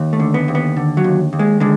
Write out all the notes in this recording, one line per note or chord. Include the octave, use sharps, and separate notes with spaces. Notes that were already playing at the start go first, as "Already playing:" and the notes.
Already playing: D#2
A3
D3
B3
D#2
B3
D3
F#3
D#2
D#2
G#3
D3 G#3